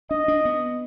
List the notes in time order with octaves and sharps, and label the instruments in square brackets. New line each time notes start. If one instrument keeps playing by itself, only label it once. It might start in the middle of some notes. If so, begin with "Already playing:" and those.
[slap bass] D4 [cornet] D#5
[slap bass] D4
B3